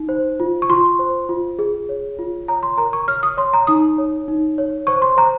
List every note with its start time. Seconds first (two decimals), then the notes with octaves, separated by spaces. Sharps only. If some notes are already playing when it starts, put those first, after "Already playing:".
Already playing: D#4
0.09 C5
0.40 F4
0.62 C#6
0.70 F4 C6
0.99 C5
1.29 F4
1.59 G#4
1.89 C#5
2.19 F4
2.48 C#5 A#5
2.63 C6
2.78 A#4 A#5
2.93 C#6
3.08 C#5 F6
3.23 D#6
3.37 C#5 C6
3.54 A#5
3.67 D#4 D#6
3.98 C#5
4.28 D#4
4.58 C#5
4.87 C5 C#6
5.02 C6
5.17 C5 A#5